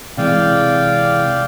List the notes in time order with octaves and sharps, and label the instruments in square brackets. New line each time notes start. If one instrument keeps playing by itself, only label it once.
[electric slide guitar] C3 E3 G#3 [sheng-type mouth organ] D5 F5 G5